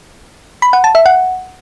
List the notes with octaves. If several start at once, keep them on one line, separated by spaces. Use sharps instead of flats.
B5
F#5
A5
E5
F#5